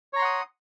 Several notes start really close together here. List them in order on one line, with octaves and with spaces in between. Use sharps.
C#5 A#5 C6 F#5 D#6